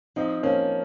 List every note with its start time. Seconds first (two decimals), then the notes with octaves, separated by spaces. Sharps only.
0.16 F3 C4 D#4
0.43 F3 A#3 C#4